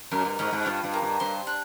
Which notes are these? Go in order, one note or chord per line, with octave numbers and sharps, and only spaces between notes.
F#2 A#4
G2
G#2 C#4
G#2
G2 F4
G2
A#3
G2
G2 C5
D4